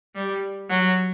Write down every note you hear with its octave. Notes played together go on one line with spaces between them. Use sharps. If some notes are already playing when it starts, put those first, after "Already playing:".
G3
F#3